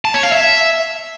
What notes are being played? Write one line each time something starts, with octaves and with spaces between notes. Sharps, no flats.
A5
C#5
F5
E5